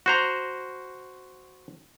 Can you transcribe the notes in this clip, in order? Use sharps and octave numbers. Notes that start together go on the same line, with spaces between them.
F#4 C5 A#5